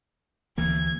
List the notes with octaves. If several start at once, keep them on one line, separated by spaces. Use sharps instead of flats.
D2 E3 A#3 G#6